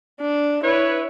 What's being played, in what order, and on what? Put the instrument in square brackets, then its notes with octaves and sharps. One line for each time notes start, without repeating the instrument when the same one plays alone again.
[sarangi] D4
[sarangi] E4 [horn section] B4 C#5